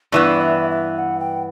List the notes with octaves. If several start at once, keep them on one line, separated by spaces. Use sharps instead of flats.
G2 E3 B3 D5
E5
E5
F#5
G5